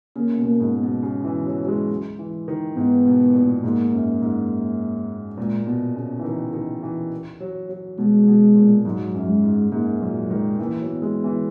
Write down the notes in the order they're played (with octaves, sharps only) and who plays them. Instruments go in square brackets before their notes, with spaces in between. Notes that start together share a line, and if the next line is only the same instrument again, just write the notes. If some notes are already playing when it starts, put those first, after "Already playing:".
[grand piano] C#3 [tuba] A#3
[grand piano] B2
[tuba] A#3
[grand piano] G#2
[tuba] B3
[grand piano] B2
C#3
E3
F#3
F#3
G#3
E3
D#3
[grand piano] G#2 [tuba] B3
[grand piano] B2
A#2
[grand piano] G#2 [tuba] A#3
[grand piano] F#2
G#2
[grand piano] A#2 [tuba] G#3
[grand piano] B2 [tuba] B3
[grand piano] C#3
E3
D#3
D#3
E3
F#3
F#3
[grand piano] B2 [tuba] G#3
[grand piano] B2
A#2
[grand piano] G#2 [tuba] F#3
[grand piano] F#2
[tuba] G#3
[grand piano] G#2
[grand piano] G#2 [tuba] A#3
[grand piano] A#2 [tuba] F#3
[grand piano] D#3 [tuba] G#3
[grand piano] E3 [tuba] A#3
[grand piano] F#3
[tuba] B3
[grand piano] G#3
[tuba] B3
[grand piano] E3